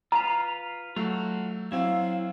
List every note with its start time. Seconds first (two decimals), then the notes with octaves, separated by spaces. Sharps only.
0.12 F4 B4 F5 A#5
0.96 F#3 A3 F4 F#4
1.72 F#3 C4 E4 F5